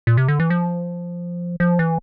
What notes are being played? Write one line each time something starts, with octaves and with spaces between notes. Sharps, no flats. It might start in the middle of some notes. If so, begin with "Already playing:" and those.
A#2
C3
D3
E3
F3
F3
E3